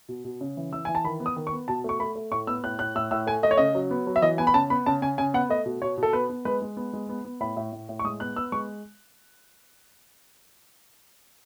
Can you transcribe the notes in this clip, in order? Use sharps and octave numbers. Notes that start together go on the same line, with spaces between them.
B2
B2
C#3
E3
E3 E6
E3 G#5
A5
D#3 B5
B3
D#6
D#3
C#6
B3
B2 A5
A3 C#6
A3 B5
A3
A2 C#6
B3 E6
A2 F#6
A2 F#6
A2 E6
A2 E6
A3 G#5
A3 D#5
C#5
C#3 D#5
F#3
B3
F#3
E5
E3 D#5
B3 G#5
B5
C#3 A5
B3 B5
C#3 A5
C#3 G#5
C#3 G#5
B3 F#5
A3 D#5
B2
B2 C#5
B2
A4
B3 B4
B3
G#3 B4
G#3
B3
G#3
B3
B3
A2 B5
A2
A2
A2
C#6
G#3 D#6
B3 F#6
B3 E6
G#3 C#6